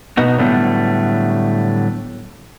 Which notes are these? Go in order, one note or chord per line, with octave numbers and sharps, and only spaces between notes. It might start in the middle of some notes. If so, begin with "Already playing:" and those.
B2 B3 D#4 F#4
A2 D3 F#3 G3 A3 B3